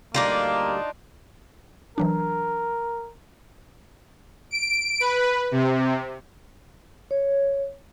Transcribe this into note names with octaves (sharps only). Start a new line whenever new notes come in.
D2 G3 A#3 D4 D#4 F4 G4
E3 F#3 D4 A#4
D7
B4
C3
C#5